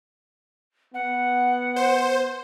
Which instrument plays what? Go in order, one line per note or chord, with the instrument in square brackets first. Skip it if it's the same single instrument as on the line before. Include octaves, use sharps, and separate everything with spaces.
[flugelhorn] B3 [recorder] F#5
[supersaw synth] C5